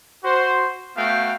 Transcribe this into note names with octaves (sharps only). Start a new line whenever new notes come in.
F#4 C5
A3 B3 F#4 F5 G5